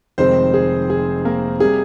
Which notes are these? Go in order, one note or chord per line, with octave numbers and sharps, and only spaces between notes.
F1 F2 D#3 G#3 C4 C5
G#4
G#4
A#3 A#4
C3 G3 A#3 G#4